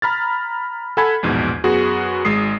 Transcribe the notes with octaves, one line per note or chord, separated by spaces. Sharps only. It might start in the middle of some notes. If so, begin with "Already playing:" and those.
A#5 B5 F6 A6
A4 F#5 G#5 B5 G#6
A#1 E2 G#2 B2
F#2 B3 F#4 G#4
G#1 G#3 D#6 C7